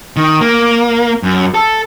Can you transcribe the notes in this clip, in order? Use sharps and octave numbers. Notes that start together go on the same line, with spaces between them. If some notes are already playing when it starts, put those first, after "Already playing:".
D#3
A#3
F#2
A4